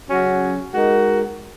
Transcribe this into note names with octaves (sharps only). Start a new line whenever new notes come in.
C#3 F#3 C#4 F#4
G#3 D#4 F#4 A#4